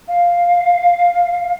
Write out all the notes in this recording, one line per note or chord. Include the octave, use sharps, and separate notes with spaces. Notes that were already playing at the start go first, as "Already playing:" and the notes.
F5